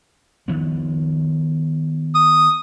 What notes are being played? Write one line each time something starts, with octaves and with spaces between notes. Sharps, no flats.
D#3 F3 B3
D#6